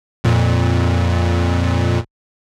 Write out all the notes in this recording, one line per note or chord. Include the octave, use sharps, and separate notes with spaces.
F2 A#2